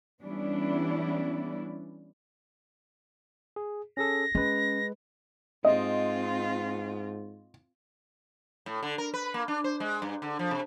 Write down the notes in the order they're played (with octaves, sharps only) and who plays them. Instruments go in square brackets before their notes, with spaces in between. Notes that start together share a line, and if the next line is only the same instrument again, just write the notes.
[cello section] E3 G3 B3 C#4 D4 E4
[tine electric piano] G#4
[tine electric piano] C#4 G#4 A4 [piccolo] A#6
[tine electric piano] G#3 B4 [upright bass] C#4
[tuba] G#2 [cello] C4 F4 [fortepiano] D#5
[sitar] A2
D3
A#4
B4
A#3
D4
C5
G#3
G2
D3
F3
C3